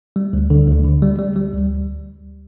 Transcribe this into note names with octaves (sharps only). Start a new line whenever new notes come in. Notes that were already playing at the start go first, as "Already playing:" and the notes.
G3
D2
D3
D2
D3
G3
G3
G3
D2